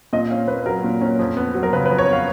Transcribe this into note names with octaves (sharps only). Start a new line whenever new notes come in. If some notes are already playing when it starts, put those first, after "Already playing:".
A#2 D#5
C#4 F5
A#3 B4
F#3 A#4
A#2
C#4
F2
B3
F#3
A#4
C#3 B4
B4
F2
C#5
B3
F5